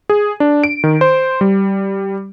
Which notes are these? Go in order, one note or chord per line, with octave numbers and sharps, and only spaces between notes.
G#4
D4
D7
D#3
C5
G3